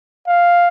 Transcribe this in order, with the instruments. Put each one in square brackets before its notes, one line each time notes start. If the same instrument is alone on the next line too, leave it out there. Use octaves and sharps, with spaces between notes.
[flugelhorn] F5